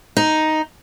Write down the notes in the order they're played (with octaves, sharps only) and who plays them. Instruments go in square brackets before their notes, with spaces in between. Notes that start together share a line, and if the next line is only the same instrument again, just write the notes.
[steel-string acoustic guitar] D#4